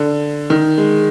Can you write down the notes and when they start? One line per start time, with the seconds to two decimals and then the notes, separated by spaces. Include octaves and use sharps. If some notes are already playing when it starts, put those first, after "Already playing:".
Already playing: D3
0.50 D#3
0.78 G#3